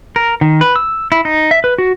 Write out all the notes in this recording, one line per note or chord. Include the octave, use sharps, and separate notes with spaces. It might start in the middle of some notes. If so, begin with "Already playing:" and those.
A#4
D#3
B4
E6
E4
D#4
E5
B4
F#4